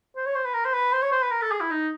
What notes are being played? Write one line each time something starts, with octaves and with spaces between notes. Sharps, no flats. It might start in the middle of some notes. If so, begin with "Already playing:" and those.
C5
C#5
C5
B4
A#4
C5
B4
C5
C#5
C5
B4
A#4
A4
G#4
E4
D#4